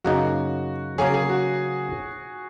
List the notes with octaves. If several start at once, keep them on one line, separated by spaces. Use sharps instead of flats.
F#2 C#3 A#3 D#4 F#4
C#3 F#3 A#3 C#4 G#4
G#4
F#4